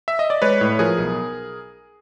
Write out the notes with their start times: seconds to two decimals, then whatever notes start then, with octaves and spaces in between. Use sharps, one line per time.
0.08 E5
0.19 D#5
0.30 D5
0.42 G#3 B4 C#5
0.61 A2
0.79 F3 G#4 A#4
0.98 B1